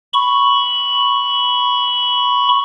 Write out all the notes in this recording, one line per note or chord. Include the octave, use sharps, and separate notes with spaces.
B5 C#6